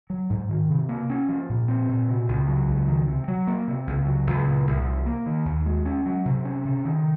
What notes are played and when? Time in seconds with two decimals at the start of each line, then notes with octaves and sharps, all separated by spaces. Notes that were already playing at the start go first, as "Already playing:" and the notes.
0.10 F#3
0.30 G#2
0.49 D#3
0.69 C3
0.89 A#3
1.10 C#4
1.29 F3
1.49 A#2
1.68 C4
1.89 A#2
2.08 C3
2.29 C#2
2.48 F#3
2.68 C#2
2.88 D#3
3.08 C3
3.28 F#3
3.47 A#3
3.68 C3
3.87 C#2
4.07 F#3
4.27 C#2
4.47 A#2
4.67 C2
4.86 F3
5.06 A#3
5.26 D#3
5.45 D#2
5.66 G#3
5.85 C#4
6.06 F#3
6.25 C3
6.45 C#4
6.65 C3
6.85 D#3